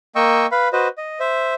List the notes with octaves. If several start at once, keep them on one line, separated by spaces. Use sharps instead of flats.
A#3 D#5 G5 C#6 E6
B4 F5 B5
F#4 B4 C5 D#5
D#5
C5 E5